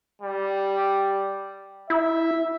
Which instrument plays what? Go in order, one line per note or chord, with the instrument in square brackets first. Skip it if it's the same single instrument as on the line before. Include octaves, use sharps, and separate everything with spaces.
[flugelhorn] G3
[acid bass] E4 [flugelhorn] E5